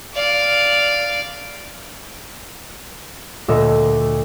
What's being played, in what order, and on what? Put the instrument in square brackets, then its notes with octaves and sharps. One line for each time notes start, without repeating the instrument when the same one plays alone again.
[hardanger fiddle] D5 F5
[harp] D2 A#2 A4 D#5